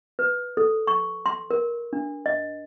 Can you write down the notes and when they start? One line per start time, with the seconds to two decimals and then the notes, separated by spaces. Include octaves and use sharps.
0.19 B4
0.57 A4
0.87 C#6
1.26 C6
1.51 A#4
1.93 D4
2.26 D#5